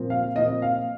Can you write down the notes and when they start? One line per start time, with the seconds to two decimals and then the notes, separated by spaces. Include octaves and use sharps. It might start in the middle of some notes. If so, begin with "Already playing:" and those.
Already playing: A#2 F3 C4
0.10 F5
0.36 A#2 F3 C4 D#5
0.62 F5